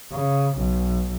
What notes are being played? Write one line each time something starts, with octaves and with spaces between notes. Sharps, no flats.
C#3
B1